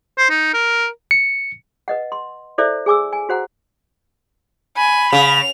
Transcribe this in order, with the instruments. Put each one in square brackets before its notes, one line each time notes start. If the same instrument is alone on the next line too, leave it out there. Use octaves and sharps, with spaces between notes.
[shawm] C5
D#4
A#4
[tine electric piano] C#7
[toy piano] B4 D#5 F#5
C6
E4 A4 C5 D5 E5
G#4 G#5 D6 E6
G#5
F#4 C5 F#5 A#5
[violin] G#5 [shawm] B5
[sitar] C#3 [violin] F7